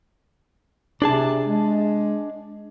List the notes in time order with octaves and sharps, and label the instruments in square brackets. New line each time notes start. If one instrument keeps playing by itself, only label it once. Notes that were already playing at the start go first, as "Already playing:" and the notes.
[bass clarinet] C3 [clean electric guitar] D4 G#4 A5
[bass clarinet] G#3